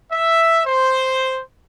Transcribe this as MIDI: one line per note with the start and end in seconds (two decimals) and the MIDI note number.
0.13 0.61 76
0.66 1.40 72